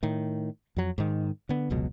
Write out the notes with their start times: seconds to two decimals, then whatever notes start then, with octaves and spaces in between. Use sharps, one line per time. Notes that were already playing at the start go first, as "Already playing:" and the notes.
0.03 A2 D#3
0.76 F2 F#3
0.98 G#2 D#3
1.49 D3 B3
1.70 F1 C#2 B2 F#3